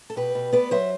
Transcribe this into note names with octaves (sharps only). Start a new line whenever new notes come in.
A4
B2 G4 B4
B2
B3 B4 D5
F#3 C5 E5